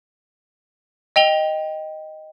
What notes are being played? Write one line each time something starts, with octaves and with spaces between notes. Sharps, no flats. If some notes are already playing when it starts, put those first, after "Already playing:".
D#5 G5 F7 G7